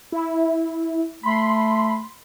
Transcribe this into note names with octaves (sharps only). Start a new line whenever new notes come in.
E4
A3 B5 C6